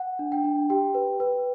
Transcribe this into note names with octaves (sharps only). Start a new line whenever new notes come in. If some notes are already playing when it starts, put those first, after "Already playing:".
Already playing: F#5
D4
G5
D4
G4 G5
B4
B4